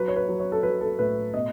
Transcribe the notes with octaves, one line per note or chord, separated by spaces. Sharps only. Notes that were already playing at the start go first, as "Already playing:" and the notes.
Already playing: F#3 B4
C#5
B4
F#3
C#5
A4
F#3 B4
A4
A2 B4
B2 D#5